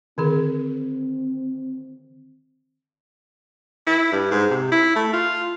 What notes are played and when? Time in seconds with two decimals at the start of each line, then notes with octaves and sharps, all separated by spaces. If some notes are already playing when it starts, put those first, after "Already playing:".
0.18 D3 D#3 C4 G#4
3.87 E4
4.12 G2
4.31 G#2
4.51 C3
4.72 E4
4.96 A3
5.13 F4